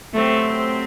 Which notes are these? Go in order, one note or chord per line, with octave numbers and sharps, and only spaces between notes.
C3 F#3 A3 C4 G4